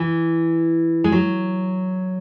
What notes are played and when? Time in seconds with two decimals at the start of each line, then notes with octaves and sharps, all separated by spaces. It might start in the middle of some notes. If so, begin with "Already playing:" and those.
Already playing: E3
1.04 G#3
1.12 F#3